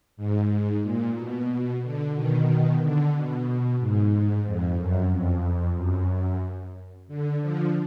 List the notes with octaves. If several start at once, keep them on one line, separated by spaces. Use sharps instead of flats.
G#2
A#2
B2
D3
B2 D#3
D3
B2
G#2
F2
F#2
F2
F#2
D3
D3 F3